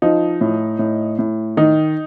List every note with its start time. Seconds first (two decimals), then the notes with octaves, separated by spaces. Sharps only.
0.02 F3 D#4
0.41 A2
0.79 A2
1.19 A2
1.57 D#3 D#4